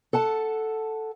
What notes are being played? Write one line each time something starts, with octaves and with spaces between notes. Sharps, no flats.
A4 F#5 A5